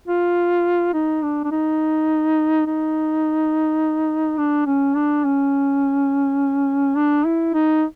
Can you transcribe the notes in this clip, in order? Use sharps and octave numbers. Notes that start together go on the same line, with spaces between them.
F4
D#4
D4
D4
D#4
D#4
D4
C#4
D4
C#4
D4
E4
D#4